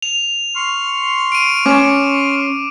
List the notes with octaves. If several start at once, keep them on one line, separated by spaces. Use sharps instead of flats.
F7
C6 C#6 F6
D7 D#7
C#4 D6